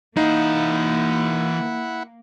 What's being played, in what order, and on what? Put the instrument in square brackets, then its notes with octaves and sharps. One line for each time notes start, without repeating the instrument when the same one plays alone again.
[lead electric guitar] E3 F5 [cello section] A#3 [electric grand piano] D#4 [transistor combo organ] E4 F#5